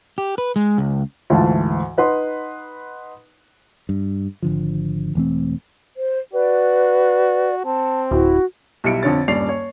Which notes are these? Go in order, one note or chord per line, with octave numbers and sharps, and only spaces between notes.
G4
B4
G#3
C#2
D2 G#2 E3 F4 A5
D#4 B4 F#5 C6
G2
G#1 D3 F3
E1 E3 A3 C4
C5
F#4 B4 D5
C4 A5
D1 E4 F#4
B1 G3 E4 C#7 D7
F2 D3 C#5 A6
D#1 G2 C#4 D5 C7 F7
C#5